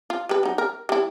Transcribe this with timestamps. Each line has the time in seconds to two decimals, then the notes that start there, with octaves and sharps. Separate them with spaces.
0.10 F4
0.29 G3 B4
0.43 F#3 D#4
0.58 A#4
0.89 G3 E4